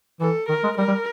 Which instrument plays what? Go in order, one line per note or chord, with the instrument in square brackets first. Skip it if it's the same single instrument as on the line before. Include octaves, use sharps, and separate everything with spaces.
[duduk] E3 [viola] A4
[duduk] D#3 [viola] A#4
[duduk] G#3
[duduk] G3 [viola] A#4
[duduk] G3